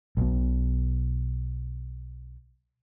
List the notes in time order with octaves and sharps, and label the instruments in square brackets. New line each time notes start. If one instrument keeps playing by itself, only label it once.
[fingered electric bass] B1 B2